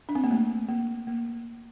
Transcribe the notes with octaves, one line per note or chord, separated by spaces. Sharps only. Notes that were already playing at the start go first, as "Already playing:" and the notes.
D4
C4
A#3
A3
A#3
A#3